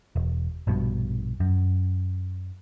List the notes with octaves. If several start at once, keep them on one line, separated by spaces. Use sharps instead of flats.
E1
A#1 G2 B2
F#2